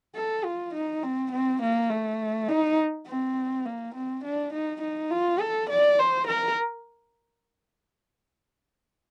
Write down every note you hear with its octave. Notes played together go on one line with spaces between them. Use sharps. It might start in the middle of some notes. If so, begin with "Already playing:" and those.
A4
F4
D#4
C4
C4
A#3
A3
D#4
C4
A#3
C4
D4
D#4
D#4
F4
A4
D5
C5
A#4